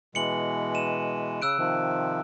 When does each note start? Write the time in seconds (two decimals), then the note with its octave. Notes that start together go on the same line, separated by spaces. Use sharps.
0.15 B2 E3 G#3 C#7 F#7
0.75 D#7 E7
1.42 C#3 E6 F#6 D7
1.58 C3 D#3 F3